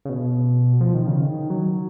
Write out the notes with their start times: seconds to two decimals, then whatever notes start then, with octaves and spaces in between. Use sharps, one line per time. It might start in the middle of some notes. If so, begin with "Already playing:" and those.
0.05 C#3
0.09 B2
0.81 F3
0.94 D#3
1.07 C#3
1.21 D#3
1.50 F#3